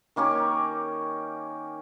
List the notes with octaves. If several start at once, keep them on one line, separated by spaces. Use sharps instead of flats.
D#3 A#3 C#4 G4